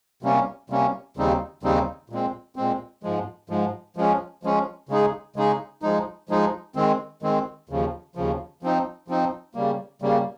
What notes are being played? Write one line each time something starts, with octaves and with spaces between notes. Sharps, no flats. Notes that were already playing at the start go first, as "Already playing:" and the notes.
C3 G3 A#3 C#4
C3 G3 A#3 C#4
D#2 C#3 G3 C4 D#4
D#2 C#3 G3 C4 D#4
A#2 G#3 C4
A#2 G#3 C4
G#2 F3 G#3
G#2 F3 G#3
F3 G#3 C#4
F3 G#3 C#4
C#3 G#3 D#4 G#4
C#3 G#3 D#4 G#4
F3 G#3 D#4
F3 G#3 D#4
D#3 G#3 C4
D#3 G#3 C4
D#2 C#3 F3
D#2 C#3 F3
F3 C4 D#4
F3 C4 D#4
C#3 G3 A#3
C#3 G3 A#3